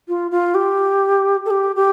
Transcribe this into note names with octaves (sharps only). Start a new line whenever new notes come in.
F4
F4
G4
A4
G4
G4